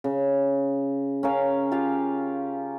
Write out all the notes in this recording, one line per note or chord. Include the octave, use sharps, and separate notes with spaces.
C#3
C#4 A#4 F5
F4 G4 F5